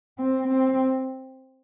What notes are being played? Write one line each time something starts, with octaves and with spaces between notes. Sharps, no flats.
C4
C4